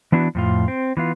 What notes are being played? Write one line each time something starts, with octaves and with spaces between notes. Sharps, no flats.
E3 B3 D4 E4 F#4
F2 A2 F4
C4
E3 B3 F4